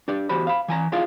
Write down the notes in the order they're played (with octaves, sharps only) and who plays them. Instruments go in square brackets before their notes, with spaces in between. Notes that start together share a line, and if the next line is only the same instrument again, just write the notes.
[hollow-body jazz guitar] D4 G4 D5
E2 F#4 G4 C5 B5
F5 B5
E3 G#5 A#5
E4 F4 G#4 D5 F5